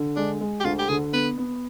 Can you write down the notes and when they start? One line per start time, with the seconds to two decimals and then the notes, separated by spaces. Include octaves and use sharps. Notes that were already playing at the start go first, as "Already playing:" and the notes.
Already playing: D3
0.16 G#3 D4
0.41 G#3
0.60 G4
0.64 D2 F4
0.79 G4
0.89 D3 G#4
1.13 B3 B4
1.38 B3